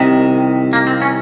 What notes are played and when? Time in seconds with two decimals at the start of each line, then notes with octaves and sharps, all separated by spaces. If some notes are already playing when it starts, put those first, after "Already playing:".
Already playing: C2 C3 D#3
0.73 A#3
0.87 C4
1.02 C#4